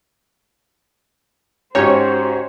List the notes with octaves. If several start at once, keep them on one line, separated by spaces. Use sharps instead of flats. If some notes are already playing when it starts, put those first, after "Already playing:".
G#2 C#4 F#4 G4 C5 C#5